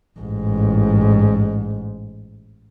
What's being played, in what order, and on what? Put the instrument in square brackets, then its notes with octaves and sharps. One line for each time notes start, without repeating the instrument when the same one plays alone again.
[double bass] A1 G#2